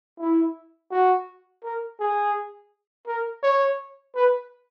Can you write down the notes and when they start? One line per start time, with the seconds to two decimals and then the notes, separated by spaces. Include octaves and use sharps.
0.19 E4
0.91 F#4
1.63 A#4
1.99 G#4
3.07 A#4
3.43 C#5
4.15 B4